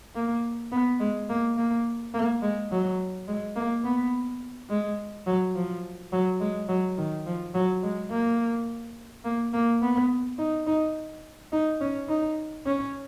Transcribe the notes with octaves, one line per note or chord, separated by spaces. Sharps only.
A#3
B3
G#3
A#3
A#3
A#3
G#3
F#3
G#3
A#3
B3
G#3
F#3
F3
F#3
G#3
F#3
D#3
F3
F#3
G#3
A#3
A#3
A#3
B3
D#4
D#4
D#4
C#4
D#4
C#4